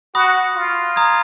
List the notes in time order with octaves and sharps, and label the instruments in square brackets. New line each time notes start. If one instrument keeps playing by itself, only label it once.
[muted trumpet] F#4 [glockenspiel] B5 D#6 A#6
[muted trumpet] F4
[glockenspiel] A#5 D#6 G#6